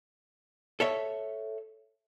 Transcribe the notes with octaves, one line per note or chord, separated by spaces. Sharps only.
A4 C#5 E5